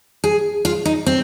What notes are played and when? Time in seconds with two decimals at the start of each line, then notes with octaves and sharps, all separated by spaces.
0.24 G#4
0.65 F4
0.85 D#4
1.06 C4